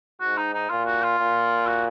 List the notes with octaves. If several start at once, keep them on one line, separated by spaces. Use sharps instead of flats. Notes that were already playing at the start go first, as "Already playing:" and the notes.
G#2 F#4
D#4
D#4
A#2 F4
F#4
F4
A#2
F#4